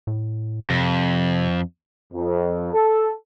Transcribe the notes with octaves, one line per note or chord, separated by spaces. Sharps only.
A2
F2 C3
F2
A4